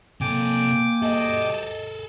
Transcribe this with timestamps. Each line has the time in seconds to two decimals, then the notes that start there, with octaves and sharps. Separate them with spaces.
0.21 C3 A#3 A4 G5 G#5 D6
1.02 D2 G3 G#4 A4 D#5